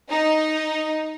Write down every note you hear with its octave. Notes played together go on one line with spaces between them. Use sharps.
D#4